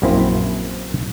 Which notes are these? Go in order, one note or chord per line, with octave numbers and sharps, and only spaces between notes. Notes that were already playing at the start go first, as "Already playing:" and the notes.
A#1 F#2 A#3 C4 E4 C5